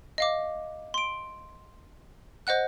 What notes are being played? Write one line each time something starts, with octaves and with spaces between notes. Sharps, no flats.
D#5 F5 D6
C6 D7
C5 D#5 F#5 F#6